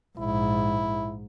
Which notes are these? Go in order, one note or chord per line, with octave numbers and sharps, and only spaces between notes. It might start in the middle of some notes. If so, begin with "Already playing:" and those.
A#1 G#2 E4